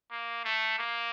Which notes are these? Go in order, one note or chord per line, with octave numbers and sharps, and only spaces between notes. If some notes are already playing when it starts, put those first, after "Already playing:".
A#3
A3
A#3